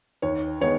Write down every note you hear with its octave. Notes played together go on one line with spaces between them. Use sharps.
D#2 C#5
D#3 G#3 B3 C#5